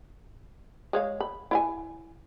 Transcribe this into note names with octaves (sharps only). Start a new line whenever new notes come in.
G#3 C#5 F5
B5
E4 F5 G#5